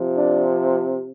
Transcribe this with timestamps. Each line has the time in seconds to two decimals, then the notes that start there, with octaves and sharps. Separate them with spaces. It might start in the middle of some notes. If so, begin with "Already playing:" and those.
Already playing: C3 F3
0.15 D4